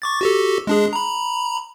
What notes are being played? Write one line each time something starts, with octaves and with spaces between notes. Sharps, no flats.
C#6 D6 A6
F#4 G4 A4
G#3 D4 G#4
A#5 B5